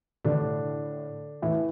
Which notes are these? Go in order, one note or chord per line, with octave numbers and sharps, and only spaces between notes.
A2 D3 D4
A2 E3 E4